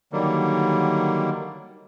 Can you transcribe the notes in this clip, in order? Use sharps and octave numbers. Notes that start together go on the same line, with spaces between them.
D3 D#3 F#3 G3 A#3